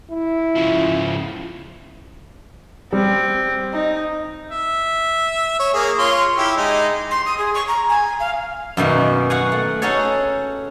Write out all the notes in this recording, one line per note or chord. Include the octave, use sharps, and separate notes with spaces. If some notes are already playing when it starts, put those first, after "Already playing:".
E4
C#3 F3
G3 C4
D#4
E5
C#5
A#3 G#4
F4 C#5 C6
E4 G4
G#3 D#4
C6
D#6
G#4
C#6
A#5
G#5
F5
F#2 B2 D#3 A#3
F#4 F5 F#5 G#5
A3
C#4 D#4 F#4 G#4 A4 C#5